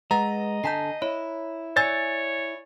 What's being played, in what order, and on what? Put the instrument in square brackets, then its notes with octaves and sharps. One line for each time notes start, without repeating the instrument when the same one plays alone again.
[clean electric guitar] G#3 [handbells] B4 F#5 A6 [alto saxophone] D#5 [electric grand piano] A#5
[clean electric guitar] D3 G#5 A5 [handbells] G6 B6 C7
[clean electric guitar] E4 [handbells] C#5
[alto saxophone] C#5 [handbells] D5 G#5 E6 [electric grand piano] A6